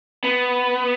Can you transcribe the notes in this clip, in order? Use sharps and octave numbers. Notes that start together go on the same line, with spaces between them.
B3